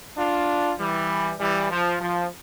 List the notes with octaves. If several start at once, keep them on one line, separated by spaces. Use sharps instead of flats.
D4 F4
E3 G3
E3 G3
F3
F3